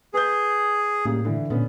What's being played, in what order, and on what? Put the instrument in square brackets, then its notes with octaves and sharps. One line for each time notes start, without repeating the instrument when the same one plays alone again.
[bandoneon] G#4 [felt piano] B4 G6
[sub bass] A2 [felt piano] C#3 G3 A#3
[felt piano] D3 E3
[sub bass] A#2 [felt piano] D3 B3 C#4